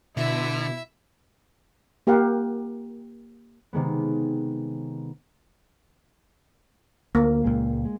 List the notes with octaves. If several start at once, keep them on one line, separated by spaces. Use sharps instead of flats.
B2 D3 E4 E5
A#3 G4 A#4 F5 F#5
C3 D#3 G#3 B3
D2 A#3
C#2 A#2 G#3
G#3